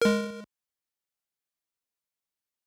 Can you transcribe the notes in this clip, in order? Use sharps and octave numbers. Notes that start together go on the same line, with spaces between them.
G#3 A#4